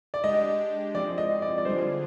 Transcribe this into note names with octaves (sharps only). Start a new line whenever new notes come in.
D5
G#3 D4 G4 D#5
F3 G#3 C4 D5
D#5
D5
D5
D3 G3 D4 F4 G#4 C5